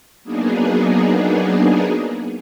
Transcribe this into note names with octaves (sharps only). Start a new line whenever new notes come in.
F#3 A#3 B3 D4 D#4 G#4